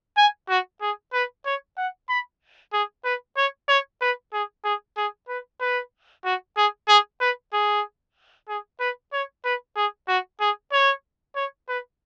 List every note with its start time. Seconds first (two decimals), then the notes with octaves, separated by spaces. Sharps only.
0.17 G#5
0.49 F#4
0.81 G#4
1.13 B4
1.45 C#5
1.78 F#5
2.09 B5
2.73 G#4
3.04 B4
3.37 C#5
3.68 C#5
4.01 B4
4.33 G#4
4.64 G#4
4.97 G#4
5.28 B4
5.60 B4
6.25 F#4
6.57 G#4
6.88 G#4
7.21 B4
7.53 G#4
8.48 G#4
8.80 B4
9.13 C#5
9.45 B4
9.76 G#4
10.08 F#4
10.40 G#4
10.72 C#5
11.36 C#5
11.68 B4